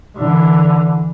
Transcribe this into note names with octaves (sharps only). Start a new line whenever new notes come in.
D3 E3